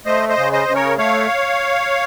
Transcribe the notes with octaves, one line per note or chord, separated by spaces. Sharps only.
A3 C5 D#5
C5 D#5
C#3
C5 D#5
C#3
A#4 C#5
A3 C#5 F5